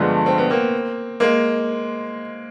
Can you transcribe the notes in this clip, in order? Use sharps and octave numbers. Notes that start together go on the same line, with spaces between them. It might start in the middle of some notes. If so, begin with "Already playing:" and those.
Already playing: G2 D3 F3 G#3 A3 B3
C4
B3
A#3 C4
G#3 A#3